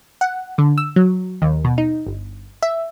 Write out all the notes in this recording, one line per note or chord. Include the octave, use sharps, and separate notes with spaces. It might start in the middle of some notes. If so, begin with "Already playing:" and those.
F#5
D3
E6
F#3
D#2
B2
D#4
G1
E5